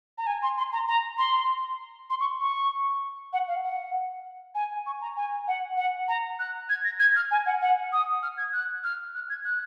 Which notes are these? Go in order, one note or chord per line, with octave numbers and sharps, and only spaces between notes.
A#5
G#5
C6
C6
A#5
A#5
C6
C6
C#6
C#6
F#5
F5
F#5
G#5
C#6
A#5
G#5
F#5
F#5
A#5
F#6
G#6
A#6
G#6
F6
G#5
F#5
F#5
D#6
F6
G#6
F#6
F6
F#6
G#6
F#6